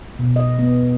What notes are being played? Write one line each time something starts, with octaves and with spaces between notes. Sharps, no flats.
B2
D#5
B3